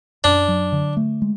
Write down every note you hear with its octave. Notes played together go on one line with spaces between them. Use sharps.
F#2 D4
F#3
D3
A3
G#3